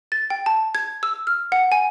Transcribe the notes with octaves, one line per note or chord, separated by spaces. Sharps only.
A6
G5
A5
G#6
E6
F6
F#5
G#5